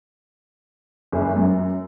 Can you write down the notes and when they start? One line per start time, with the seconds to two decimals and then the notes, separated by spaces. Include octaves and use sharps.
1.12 F#1
1.36 F#2